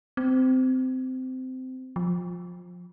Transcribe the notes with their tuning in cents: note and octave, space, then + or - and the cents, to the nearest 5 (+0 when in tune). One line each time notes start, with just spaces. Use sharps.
C4 -20
F3 +20